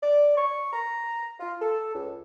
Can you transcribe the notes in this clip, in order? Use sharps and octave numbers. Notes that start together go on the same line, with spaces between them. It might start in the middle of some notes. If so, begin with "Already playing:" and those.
D5
C#6
A#5
F4
A4
C#2